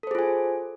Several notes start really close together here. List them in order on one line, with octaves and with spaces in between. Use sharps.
A4 C5 G#4 F4 G#5